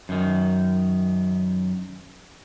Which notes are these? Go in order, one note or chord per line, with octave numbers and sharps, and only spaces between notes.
F#2 D#3